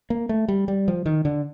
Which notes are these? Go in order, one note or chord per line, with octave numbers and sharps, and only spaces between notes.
A#3
A3
G3
G3
F3
D#3
D3